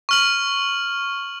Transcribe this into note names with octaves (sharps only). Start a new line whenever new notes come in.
C#6 F6 F#7